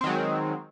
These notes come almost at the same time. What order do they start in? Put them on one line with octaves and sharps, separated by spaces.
C4 D#3 F#3 G#3